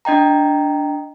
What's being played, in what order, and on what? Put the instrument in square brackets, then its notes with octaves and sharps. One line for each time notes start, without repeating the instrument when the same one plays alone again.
[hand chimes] D4 D#5 G5 A#5